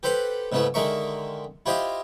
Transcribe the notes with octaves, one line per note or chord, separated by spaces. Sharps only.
G4 A4 B4 C5 F#5
G#2 C#3 A3 B3 E4
D3 D#3 G#3 A#4 E5 C#6
E4 F4 G4 C5 D#5 F5